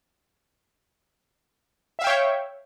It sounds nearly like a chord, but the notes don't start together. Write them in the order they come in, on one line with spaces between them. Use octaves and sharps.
E5 F5 G5 C#5